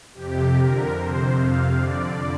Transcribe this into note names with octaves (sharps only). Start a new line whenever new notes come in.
F2 C3 G4
F2 D3 A#4
F2 C3 C5
F2 C3 F5
F2 D3 D5